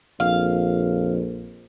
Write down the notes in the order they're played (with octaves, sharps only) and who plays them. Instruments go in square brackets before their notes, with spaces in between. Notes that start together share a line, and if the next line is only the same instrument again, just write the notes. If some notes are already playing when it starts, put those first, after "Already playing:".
[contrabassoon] A#1 [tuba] F2 [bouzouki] F5